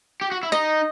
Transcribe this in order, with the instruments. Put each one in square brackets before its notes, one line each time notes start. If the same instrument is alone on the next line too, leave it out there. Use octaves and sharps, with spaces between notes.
[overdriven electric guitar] G4
F#4
E4
[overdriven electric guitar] D#4 [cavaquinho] D#5